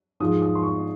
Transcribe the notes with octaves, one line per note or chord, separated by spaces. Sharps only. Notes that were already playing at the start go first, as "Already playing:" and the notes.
G#2 F3 G#3 D#6
D#6
C6
C#6